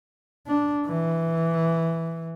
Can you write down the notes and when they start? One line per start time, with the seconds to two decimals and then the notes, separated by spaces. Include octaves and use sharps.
0.47 D4
0.86 E3